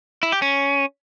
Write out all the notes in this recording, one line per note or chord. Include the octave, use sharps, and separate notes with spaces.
E4
G4
C#4